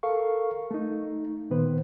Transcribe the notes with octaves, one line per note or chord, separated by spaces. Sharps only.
A4 A#4 F5 C#6
A3 D#4
A#2 D#3 B3 B4 C5